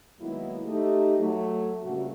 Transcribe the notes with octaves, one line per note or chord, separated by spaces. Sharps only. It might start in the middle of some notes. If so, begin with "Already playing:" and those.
D#3 F#3 G#3 A#3 B3 E4
A3 D#4 G4
F#3 A3
G2 A#2 C#3 A3 A#3 F#4